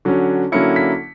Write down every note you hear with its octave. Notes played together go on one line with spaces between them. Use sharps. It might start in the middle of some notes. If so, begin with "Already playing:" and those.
D3 F#3 C#4
D3 F#3 A#3 C#4 E4 C#7
B6